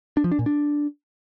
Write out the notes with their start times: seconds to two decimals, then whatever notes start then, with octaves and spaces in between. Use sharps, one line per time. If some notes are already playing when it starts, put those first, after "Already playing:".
0.17 D4
0.24 F3
0.32 D4
0.39 A#2
0.46 D4